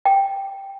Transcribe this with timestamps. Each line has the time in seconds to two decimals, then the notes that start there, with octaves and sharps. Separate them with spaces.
0.05 G5